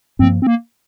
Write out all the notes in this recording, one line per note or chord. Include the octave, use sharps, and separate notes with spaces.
G2 F3 A#3 C4
C4
A#3